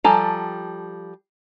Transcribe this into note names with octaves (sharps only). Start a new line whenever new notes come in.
F3 G3 A4 G#5 A#5